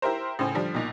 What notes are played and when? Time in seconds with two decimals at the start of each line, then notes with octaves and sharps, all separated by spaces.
0.02 E4 G4 A#4 C5
0.39 A2 C#3 C5 G#5
0.54 D3 F3 G3
0.74 B1 A#2